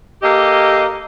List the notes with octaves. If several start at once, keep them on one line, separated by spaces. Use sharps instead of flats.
A#3 G4 A4 D#5